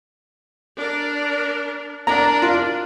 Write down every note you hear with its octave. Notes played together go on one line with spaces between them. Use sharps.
D4 A#4
D4 A#4 A#5
F4